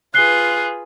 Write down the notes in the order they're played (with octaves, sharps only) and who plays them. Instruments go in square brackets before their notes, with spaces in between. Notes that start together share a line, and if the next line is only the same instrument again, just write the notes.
[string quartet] F4 G#4 B4 [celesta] F#6 C7 G7